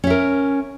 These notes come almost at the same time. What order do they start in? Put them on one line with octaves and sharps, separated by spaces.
C#4 E5 A#4